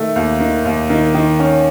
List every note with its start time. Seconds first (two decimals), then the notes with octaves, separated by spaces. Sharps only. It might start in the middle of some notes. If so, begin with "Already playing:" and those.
Already playing: D#3 A3
0.16 D#2
0.40 D#3
0.65 D#2
0.90 D#3
1.14 D#3
1.39 C#4